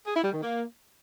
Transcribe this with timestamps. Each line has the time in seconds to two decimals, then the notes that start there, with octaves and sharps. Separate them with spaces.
0.05 G#4
0.15 E4
0.24 G3
0.33 D#3
0.42 A#3